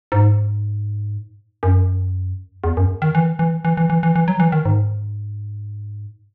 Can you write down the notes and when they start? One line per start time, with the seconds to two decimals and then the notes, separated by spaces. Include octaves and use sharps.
0.12 G#2
1.63 F#2
2.64 E2
2.77 F#2
3.02 D#3
3.15 E3
3.39 E3
3.65 E3
3.77 E3
3.90 E3
4.03 E3
4.16 E3
4.28 F#3
4.40 E3
4.52 D#3
4.65 G#2